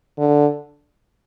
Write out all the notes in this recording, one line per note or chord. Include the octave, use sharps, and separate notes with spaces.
D3